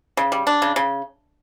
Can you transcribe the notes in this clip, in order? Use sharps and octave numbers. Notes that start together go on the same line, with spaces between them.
C#3
G3
D4
C#3
C#3